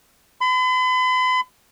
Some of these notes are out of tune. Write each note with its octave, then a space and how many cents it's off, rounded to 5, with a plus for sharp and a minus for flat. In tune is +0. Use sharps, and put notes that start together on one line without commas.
B5 +45